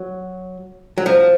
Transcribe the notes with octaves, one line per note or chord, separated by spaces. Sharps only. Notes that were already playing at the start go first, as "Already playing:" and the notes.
Already playing: F#3
F#3
F3